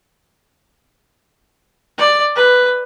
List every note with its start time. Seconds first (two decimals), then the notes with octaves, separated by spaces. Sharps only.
1.98 D5
2.36 B4